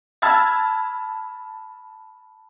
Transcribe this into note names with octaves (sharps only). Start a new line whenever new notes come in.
A5 B5 E6 F6 G#6 A6